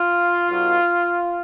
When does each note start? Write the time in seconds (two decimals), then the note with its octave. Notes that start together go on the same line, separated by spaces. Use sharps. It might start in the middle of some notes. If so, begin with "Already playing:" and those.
Already playing: F4
0.47 B1 B2 F#3